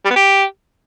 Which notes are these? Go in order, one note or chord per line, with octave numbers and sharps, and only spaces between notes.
G3
B3
G4